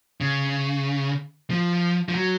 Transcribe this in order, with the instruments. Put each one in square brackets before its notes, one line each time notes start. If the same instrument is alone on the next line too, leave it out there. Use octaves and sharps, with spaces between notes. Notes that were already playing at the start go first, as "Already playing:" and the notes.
[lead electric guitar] C#3
F3
F3
F#3